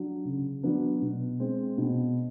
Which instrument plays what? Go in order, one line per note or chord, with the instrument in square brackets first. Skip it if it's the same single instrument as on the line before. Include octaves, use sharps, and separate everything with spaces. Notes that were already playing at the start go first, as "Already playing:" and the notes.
Already playing: [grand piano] F#3 D4
C#3
F#3 B3 D4
B2
G#3 C4
B2